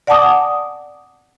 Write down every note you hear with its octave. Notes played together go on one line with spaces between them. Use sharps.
D5 F#5 G#5 A5 D6 D#6